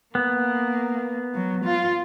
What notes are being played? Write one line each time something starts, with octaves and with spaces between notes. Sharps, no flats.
A#3 B3
F#3
F4